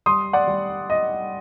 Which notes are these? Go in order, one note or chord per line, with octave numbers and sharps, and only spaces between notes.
G3 C6 D#6
D5 F#5
G3
D#5